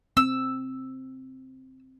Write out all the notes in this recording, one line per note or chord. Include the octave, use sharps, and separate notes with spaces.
C4 E6